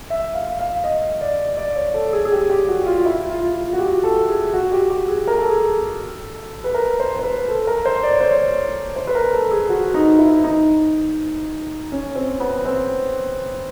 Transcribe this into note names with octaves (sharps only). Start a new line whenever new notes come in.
E5
F5
F5
D#5
D5
D5
C#5
A4
G#4
G#4
G4
G4
F#4
F4
E4
F4
F4
F#4
G4
A4
G#4
F#4
G4
G4
G#4
A#4
A4
G#4
A4
B4
A#4
C5
C5
B4
A4
A#4
C5
D5
C#5
C5
C#5
C5
B4
A#4
A4
G#4
F#4
D#4
E4
D#4
C#4
C4
B3
C4